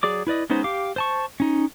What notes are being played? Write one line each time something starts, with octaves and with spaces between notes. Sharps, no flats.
F#3 G#4 D5 D6
E4 B4 D5 D#5
G#3 B3 C#4 D#4 C5
G4 F5 D6
C5 A5 C#6
C#4 D#4